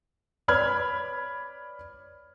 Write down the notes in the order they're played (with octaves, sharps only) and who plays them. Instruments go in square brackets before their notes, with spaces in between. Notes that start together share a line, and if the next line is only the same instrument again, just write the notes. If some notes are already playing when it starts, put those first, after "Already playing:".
[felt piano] B4 C#5 D5 B5 F6 G#6